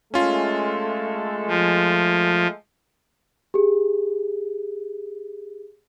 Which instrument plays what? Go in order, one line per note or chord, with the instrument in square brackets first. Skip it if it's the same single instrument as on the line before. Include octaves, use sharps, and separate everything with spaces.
[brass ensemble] G#3 A3 A4 [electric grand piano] C#4 F4
[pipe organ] F3
[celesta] G4 G#4